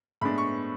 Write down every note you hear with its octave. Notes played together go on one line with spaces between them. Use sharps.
A2 G#3 B3 D4 B5
C#6